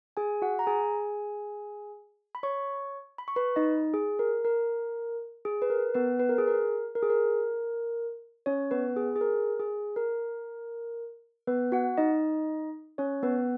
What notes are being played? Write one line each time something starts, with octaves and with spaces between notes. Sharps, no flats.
G#4 G#5
F#4 F#5
A#5
G#4 G#5
B5
C#5 C#6
B5
C#6
B4 B5
D#4 D#5
G#4
A#4
A#4
G#4
B4
A#4
B3 B4
B4
A#4
G#4
A#4
A#4
G#4
A#4
C#4 C#5
B3 B4
G#4
G#4
A#4
G#4
A#4
B3 B4
F#4 F#5
D#4 D#5
C#4 C#5
B3 B4